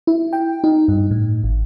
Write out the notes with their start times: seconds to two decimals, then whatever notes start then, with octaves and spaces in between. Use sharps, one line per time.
0.07 E4
0.33 G5
0.64 D#4
0.88 G2
1.11 A2
1.44 G#1